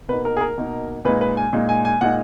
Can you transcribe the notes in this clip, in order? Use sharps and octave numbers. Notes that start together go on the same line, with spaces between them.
B2 A#3 D#4 B4
A#4
G#4
A#4
B2 A#3 D#4
A#2 G#3 D#4 B4
B4
G#5
A#2 G#3 D#4
G#5
G#5
A#2 G#3 D#4 F#5